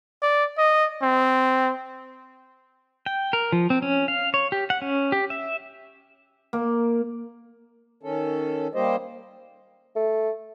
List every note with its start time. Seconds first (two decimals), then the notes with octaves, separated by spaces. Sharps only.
0.22 D5
0.58 D#5
1.02 C4
3.06 G5
3.33 A#4
3.52 F3
3.70 C4
3.82 C#4
4.08 F5
4.34 C#5
4.52 G4
4.70 F#5
4.82 C#4
5.12 G4
5.30 E5
6.53 A#3
8.03 D#3 C#4 A4
8.75 G3 A#3 G4 C5 D#5
9.96 A3